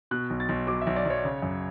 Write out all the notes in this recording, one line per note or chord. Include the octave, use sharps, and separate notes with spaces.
B2 F#6
B1
A6
B1
F#3 D6
E5
B1
D5
B1 C#5
C#3
F#2